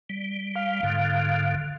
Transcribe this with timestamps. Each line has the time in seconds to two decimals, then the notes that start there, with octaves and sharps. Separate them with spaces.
0.10 G3
0.56 F5
0.83 G#2 D3